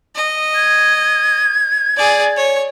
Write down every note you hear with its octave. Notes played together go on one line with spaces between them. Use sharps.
D#5
G#6
G#4 D5
C#5